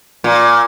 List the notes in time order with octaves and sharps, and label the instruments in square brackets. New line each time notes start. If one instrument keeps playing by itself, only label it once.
[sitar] A#2